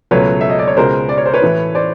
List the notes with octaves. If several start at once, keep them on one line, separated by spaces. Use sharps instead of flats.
C#2 B2 F#3 A3 B4 C#5
E5
D#5
D5
C#5
C#2 B2 G#3 A#4 C5
D5
C#5
C5
B4 C#5
A2 E3 A3
C5 D5